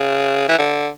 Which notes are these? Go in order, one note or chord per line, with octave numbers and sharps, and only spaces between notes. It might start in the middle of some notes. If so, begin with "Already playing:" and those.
Already playing: C#3
E3
D3